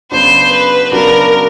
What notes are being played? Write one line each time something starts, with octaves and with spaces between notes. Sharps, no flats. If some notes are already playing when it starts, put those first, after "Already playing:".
C#3 F#3 B3 D4 F#4 C5
B4
C#3 F#3 B3 D4 F#4 A#4